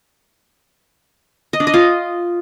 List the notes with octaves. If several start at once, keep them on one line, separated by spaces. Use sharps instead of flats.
D#5
D4
D#5
F4